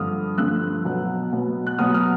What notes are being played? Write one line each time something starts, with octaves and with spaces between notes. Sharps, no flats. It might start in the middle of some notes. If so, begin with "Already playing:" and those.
Already playing: G2 D3 F3 D#6 F6
G2 D3 F3 E6 F#6
B2 F#3 B3
B2 F#3 B3
F#6
B2 F#3 B3 D#6 F6
D#6 F6